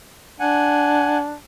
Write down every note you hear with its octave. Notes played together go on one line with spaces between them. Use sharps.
D4 F#5 G#5